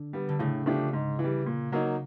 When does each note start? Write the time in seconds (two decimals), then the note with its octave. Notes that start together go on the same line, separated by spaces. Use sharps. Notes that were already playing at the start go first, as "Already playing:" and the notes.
Already playing: D3
0.13 G3 B3
0.29 D3
0.39 A2 C#3
0.66 F3 A3 D4 G4
0.93 G#2
1.19 E3
1.24 G3
1.46 A#2
1.72 F#3 A#3 D#4